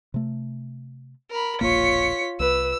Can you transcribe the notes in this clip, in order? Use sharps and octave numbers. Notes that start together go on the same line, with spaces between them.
C3 A3
A#4 B5
E1 A#1 A#3 F4 C#5 B6 C#7
C2 B4 E6